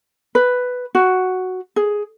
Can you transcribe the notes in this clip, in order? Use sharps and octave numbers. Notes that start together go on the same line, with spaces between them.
B4
F#4
G#4